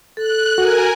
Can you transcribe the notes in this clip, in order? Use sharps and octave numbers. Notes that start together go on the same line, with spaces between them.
A4 F#6
F#4 A#4 G#5